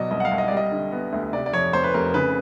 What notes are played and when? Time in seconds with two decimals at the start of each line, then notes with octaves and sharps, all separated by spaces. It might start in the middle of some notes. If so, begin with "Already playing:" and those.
Already playing: B2 F#3 D5 D#5
0.11 C2 D#5
0.20 F#5
0.25 F5
0.31 C2
0.38 D#5
0.48 G3 D5
0.57 D#5
0.72 D3
0.92 B3
1.13 D2
1.33 C3 D5
1.46 D5
1.53 F2 C#5
1.73 F1 C5
1.84 B4
1.94 F1 A#4
2.14 C#3 B4